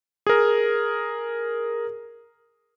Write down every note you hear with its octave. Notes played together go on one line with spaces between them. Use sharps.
G#4 A#4